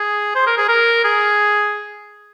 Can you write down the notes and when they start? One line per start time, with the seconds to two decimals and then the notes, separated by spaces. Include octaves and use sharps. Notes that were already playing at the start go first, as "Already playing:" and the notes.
Already playing: G#4
0.35 C5
0.47 A#4
0.58 G#4
0.69 A#4
1.04 G#4